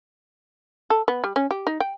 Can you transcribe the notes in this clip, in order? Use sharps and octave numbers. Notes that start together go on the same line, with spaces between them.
A4
B3
G3
C#4
G4
D#4
G5